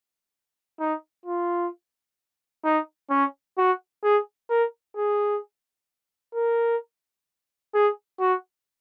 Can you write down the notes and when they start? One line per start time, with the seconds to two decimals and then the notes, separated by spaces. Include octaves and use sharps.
0.80 D#4
1.26 F4
2.65 D#4
3.10 C#4
3.58 F#4
4.04 G#4
4.50 A#4
4.96 G#4
6.34 A#4
7.74 G#4
8.20 F#4